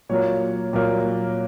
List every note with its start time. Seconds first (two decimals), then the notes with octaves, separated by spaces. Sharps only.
0.09 A#2 F#3 A#3 C#5
0.73 A#2 F#3 A#3